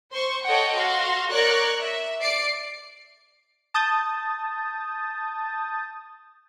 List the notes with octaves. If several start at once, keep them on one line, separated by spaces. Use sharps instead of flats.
C5 C6 C#6
A4 C#5 D#5 F#5 G5
F#4 F5 C6
A#4 C#5 D5 C#6 F#6
E5
D5 C7 D7
A5 D#6 G6 A6